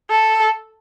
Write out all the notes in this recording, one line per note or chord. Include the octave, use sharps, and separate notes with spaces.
A4